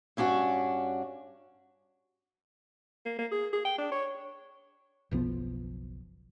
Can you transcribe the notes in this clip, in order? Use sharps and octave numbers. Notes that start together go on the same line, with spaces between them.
G2 C#4 D4 F#4
A#3
A#3
G#4
G#4
G5
D4
C#5
F#1 B1 F3 B3